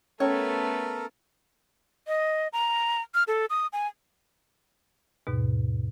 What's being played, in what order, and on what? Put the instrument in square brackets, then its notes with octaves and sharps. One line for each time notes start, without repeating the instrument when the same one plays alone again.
[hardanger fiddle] A3 B3 [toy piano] C#4 [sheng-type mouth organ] A4 A#4 [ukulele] C#5
[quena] D#5
A#5
F6
A4
D#6
G#5
[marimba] D#2 G#2 B2